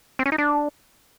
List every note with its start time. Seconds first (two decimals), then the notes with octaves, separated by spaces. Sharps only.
0.19 C4
0.26 C#4
0.32 D#4
0.38 D4